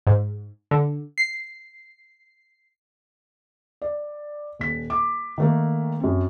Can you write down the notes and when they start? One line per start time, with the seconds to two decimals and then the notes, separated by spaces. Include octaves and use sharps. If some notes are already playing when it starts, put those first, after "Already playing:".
0.07 G#2
0.71 D3
1.18 C7
3.82 D5
4.59 D#1 B6
4.90 D6
5.38 D#3 A3 A#3
6.00 F#2 C4